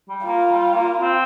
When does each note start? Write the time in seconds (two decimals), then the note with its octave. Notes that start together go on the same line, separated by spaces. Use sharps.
0.09 G3
0.26 A#3 F4
0.51 G3
0.75 A#3
0.99 C4